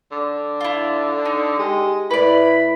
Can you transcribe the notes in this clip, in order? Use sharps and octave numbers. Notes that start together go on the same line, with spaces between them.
D3
E4 F4
D#4
G#3 G4
A2 E4 B4 D5 B5